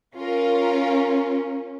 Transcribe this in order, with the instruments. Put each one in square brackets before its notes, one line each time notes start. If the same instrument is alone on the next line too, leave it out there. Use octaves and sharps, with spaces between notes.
[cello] C#4 [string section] F4 A#4